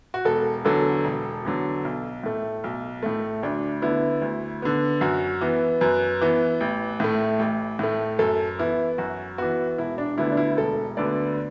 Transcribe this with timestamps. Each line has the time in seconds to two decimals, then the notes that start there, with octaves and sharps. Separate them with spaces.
0.14 F#4
0.25 E1 A4
0.65 E2 D3 F#3 A4
1.04 E1
1.45 E2 D3 F#3
1.85 B1
2.23 A2 A3
2.64 B1
3.03 A2 A3
3.43 D2 D4
3.82 D3 B3 E4
4.22 D2
4.62 D3 B3
5.01 F#2 F#4
5.41 E3 B3
5.81 F#2 B4
6.21 E3 B3
6.61 A1
7.00 A2 A3
7.39 A1
7.79 A2 A3
8.19 F#2 A4
8.59 E3 B3 E4
8.98 F#2 F#4
9.38 E3 B3 F#4
9.78 E1 E4
9.98 D4
10.18 D2 D3 B3 E4
10.32 D4
10.37 E4
10.57 E1 A4
10.97 D2 D3 B3 D5